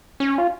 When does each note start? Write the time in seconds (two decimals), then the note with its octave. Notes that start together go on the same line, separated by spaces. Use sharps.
0.20 C#4
0.38 F4